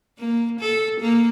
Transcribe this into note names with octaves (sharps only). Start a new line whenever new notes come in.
A#3
A4
A#3